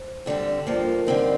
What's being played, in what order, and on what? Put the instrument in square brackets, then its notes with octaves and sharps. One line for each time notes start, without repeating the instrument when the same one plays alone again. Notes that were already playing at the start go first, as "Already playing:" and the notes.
Already playing: [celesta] C5
[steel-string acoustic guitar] D2 D3 G3 C4
[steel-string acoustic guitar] G2 F3 A#3 [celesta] C5
[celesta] A#4
[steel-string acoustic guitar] D3 G3 C4 D#4 [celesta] A#4